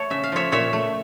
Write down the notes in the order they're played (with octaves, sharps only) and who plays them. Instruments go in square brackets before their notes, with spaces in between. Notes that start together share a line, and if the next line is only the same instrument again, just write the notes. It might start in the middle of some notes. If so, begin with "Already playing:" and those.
Already playing: [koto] A3 A4 C#5
C#3 E5
F5
F3 A3 C#5 E5
A#2 C#5 E5
A3